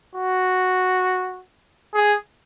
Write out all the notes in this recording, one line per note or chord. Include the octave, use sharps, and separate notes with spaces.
F#4
G#4